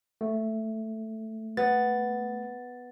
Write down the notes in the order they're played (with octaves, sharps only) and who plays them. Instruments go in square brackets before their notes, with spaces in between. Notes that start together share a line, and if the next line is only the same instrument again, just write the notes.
[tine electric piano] A3
[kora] B3 [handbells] A6